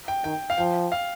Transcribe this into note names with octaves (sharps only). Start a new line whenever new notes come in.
G5
D#3 G5
F5
F3 G5
F5